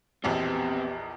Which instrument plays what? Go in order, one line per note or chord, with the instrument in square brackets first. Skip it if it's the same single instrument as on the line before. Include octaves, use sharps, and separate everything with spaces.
[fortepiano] A#1 E2 B2 [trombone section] B3 G4 [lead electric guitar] C4